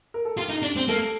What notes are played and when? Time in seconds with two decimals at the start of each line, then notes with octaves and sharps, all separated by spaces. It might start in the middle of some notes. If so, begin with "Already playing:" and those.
0.14 A#4
0.25 A4
0.37 F4 G4
0.49 D#4
0.62 D4
0.76 C4
0.88 A#3 A4